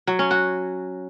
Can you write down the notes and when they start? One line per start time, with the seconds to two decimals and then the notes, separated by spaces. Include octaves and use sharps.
0.07 F#3
0.19 C#4
0.31 F#4